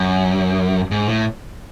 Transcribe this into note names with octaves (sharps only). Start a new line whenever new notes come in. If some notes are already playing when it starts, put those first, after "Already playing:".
Already playing: F#2
G#2
A2